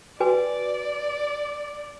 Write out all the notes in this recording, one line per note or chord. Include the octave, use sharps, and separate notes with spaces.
F#4 B4 D5 G#5